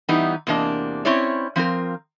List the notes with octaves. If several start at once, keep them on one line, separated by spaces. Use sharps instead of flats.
E3 G3 B3 D#4
E2 C3 A#3 D4 D#5
C4 C#4 E4 C#5 D5
F3 C4 F4 A#4